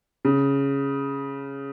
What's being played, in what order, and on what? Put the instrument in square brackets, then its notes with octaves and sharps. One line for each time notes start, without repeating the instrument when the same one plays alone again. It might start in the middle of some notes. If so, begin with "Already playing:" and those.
[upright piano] C#3